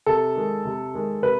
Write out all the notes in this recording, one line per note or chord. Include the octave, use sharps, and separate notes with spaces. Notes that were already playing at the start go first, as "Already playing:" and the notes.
C3 A4
D#3 G#3
C3
D#3 G#3
C3 B4